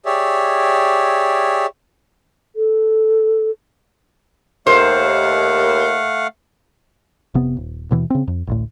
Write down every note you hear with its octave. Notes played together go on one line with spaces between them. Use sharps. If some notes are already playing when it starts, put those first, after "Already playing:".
G4 G#4 C#5 D5 E5
A4
D#2 A3 C5 F5 F#5
F1 C3 B3
D#1
D#2 B2 E3
C#3 C4
F2
A1 D2 A2